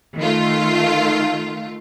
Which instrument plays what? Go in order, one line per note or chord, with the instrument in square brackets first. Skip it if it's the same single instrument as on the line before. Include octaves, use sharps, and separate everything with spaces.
[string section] D#3 A3 F4